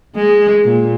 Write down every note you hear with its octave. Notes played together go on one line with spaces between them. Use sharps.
G#3
A#2